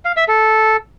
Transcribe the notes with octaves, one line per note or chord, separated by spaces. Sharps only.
F5
E5
A4